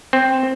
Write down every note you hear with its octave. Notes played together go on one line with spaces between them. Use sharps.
C4